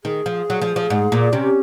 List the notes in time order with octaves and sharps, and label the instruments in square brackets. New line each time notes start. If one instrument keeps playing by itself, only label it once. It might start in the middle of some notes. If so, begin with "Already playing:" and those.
[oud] D#3 [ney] G#4
[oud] F3
F#3
F3
F3
G#2
A#2
[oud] C3 [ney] C#4